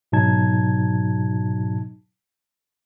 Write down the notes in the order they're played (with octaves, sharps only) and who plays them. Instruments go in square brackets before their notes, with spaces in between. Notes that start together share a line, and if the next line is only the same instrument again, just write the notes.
[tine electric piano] G#2 B2 F#3 D#4 A5 G#6